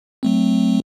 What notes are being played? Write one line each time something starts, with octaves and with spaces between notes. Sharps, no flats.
F#3 A3 C4